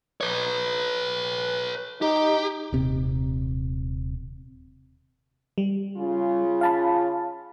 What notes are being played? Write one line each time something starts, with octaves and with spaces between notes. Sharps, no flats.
B4 C#5
D#4 G4
D#1 C3
G3
C#3 F4
F5 A5 B5